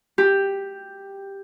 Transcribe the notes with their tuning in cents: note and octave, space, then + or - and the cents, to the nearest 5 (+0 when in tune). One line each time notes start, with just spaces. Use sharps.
G4 +5